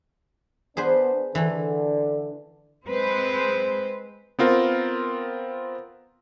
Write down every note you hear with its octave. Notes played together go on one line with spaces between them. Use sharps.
B3 D4 G#4 B4 C5
D3 E3 A3
G#3 C4 B4 C5
B3 C4 F4 A#4